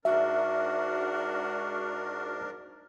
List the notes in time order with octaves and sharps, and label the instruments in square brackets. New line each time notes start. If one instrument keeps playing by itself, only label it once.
[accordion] G#2 D4 A#4 [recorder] F#4 [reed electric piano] E5